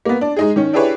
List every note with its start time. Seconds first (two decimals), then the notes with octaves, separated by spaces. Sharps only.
0.06 A#3 B3
0.21 D4
0.36 G#3 D#4 G#4
0.56 D#3 C#4
0.73 D4 E4 G4 G#4 B4 C#5